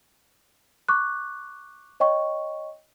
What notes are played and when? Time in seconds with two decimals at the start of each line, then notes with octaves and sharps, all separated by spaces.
0.88 C#6 D6 F#6
2.00 C#5 D#5 G5 C#6